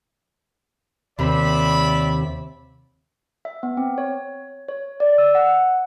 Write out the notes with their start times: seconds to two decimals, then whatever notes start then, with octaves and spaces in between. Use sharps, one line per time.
1.19 D#2 C3 D5 E5 B5
3.45 E5
3.63 B3
3.77 C4
3.98 C#5
4.68 C#5
5.00 D5
5.18 E6
5.35 F#5